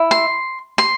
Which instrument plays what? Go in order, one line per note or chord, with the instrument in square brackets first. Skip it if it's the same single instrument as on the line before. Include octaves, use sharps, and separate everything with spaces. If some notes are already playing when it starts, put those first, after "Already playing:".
Already playing: [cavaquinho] E4
C6
C6